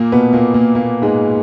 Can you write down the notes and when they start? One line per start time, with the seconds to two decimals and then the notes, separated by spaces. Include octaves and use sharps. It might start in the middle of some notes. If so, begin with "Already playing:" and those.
Already playing: A#2 A#3
0.12 B2 B3
0.33 A#2 A#3
0.54 A#2 A#3
0.75 A#2 A#3
1.02 G#2 G#3